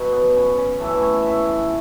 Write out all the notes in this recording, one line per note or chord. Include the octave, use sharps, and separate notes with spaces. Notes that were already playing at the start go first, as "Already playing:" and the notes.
Already playing: B2 F#3
B3
C#4
C#4
A2 E3 A4
C#5
E5